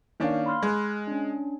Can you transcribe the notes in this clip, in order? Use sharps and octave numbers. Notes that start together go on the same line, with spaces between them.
D#3 A#3 C#4 D4 F5
B5 C6 F6
G#3 F6 F#6
C#4 D4